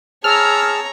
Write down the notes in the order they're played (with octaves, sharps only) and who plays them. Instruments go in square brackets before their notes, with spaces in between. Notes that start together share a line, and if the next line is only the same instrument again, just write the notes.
[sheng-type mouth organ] G#4 A5 [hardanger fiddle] C#5 A#5 [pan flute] E6 [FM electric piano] F6